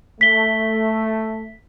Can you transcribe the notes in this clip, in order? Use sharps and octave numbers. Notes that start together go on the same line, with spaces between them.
A3 B6 G7